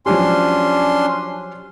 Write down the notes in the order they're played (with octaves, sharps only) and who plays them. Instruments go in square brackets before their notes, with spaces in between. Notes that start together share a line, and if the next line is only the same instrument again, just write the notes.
[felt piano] F3 F#3 G4 [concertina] C#4 D4 C6